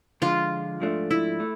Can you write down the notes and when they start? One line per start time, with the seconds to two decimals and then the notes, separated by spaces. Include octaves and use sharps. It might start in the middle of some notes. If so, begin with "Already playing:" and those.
0.22 D3 F3 G#3 F4
0.80 G#2 F3 A3 D4
1.11 E4
1.40 A3